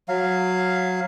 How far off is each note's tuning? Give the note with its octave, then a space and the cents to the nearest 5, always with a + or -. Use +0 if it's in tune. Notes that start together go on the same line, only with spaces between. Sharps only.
F#3 -10 F5 +0